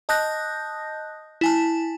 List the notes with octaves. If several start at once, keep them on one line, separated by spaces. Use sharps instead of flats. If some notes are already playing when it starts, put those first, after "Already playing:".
D#5 A5 D#6 F#6 G6 A#6
E4 G#5 A5